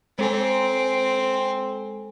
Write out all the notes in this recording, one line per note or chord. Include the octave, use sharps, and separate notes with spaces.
G#3 C4 A4 G#5